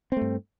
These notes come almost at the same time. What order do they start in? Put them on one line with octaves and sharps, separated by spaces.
C4 A3 G2